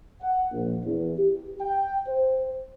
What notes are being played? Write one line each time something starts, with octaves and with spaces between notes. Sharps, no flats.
F#5
A#1
E2
G4
G5
C5